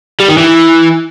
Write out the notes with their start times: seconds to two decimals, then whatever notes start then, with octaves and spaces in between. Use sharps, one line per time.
0.20 G3
0.29 D#3
0.38 E3